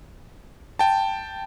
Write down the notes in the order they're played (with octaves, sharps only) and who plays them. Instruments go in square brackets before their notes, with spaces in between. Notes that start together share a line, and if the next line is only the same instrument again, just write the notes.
[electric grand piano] G5 A5